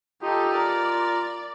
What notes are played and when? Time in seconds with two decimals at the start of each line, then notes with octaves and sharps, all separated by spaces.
0.22 D#4 F4 G4 A4
0.53 A#4 D5